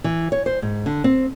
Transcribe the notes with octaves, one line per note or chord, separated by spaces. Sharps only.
E3
C#5
C5
G#2
D3
C4